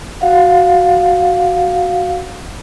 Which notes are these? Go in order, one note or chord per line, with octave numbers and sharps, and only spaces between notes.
F#4 F5 F#5